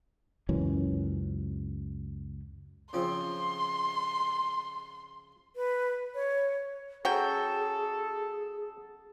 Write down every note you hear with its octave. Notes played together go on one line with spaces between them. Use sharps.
C#2 F#2 E3 C#4
C#3 F3 C4 C6
B4
C#5
F#3 C#4 F#4 G#4 A4 G5